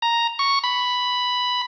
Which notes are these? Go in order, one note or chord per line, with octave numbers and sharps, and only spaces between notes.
A#5
C#6
B5